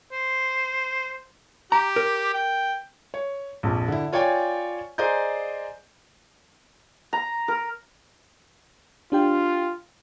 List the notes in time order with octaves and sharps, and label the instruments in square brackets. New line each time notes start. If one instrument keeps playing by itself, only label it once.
[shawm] C5
[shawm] G4 [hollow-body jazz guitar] A#5
[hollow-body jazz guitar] A#4
[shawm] G5
[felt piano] C#5
A#1 F2
D3 E4
F4 C#5 D5 G5 G#5 C#6
G#4 C5 D5 D#5 A#5 G6
[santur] A#5
A#4
[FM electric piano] D4 G4 G5 [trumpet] F4